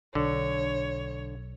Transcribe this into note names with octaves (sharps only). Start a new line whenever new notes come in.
B1 D3 C#5